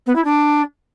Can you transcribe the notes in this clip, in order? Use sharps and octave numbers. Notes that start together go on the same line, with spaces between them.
B3
E4
D4